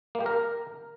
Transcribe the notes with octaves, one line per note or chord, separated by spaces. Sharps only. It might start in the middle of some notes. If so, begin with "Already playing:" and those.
A#3
G4
A#4